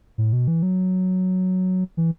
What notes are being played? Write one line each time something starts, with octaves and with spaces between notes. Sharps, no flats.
A2
B2
E3
F#3
E3